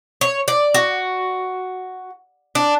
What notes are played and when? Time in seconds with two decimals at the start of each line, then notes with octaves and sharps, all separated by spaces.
0.21 C#5
0.48 D5
0.74 F#4
2.55 D4